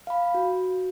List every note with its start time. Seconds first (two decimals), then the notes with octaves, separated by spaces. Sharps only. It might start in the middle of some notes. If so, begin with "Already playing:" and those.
0.07 F5 B5
0.34 F#4